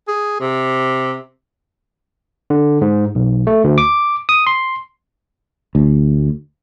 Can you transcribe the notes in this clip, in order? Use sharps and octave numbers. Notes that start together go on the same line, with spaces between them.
G#4
C3
D3
G#2
B1
A3
D2
D6
D#6
C6
D2